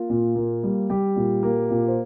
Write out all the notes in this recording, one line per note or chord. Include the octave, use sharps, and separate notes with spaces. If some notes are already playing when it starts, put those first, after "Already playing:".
Already playing: A#3 F4
A#2
A#3
G3
G3 G4
A#2
A#3
A#2
C5